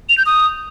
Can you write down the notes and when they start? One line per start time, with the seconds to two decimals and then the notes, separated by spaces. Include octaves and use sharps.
0.09 F7
0.17 G6
0.26 D#6